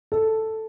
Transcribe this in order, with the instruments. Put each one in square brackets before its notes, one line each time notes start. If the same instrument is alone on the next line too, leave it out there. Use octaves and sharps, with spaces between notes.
[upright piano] A4